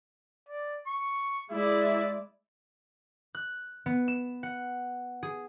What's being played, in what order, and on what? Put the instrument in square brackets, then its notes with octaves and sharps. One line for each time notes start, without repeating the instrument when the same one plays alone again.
[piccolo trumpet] D5
C#6
[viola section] G#3 E4 D5 [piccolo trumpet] E5
[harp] F#6
B3
E7
F#5
G#4